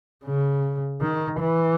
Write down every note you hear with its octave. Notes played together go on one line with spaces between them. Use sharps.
C#3
D#3
E3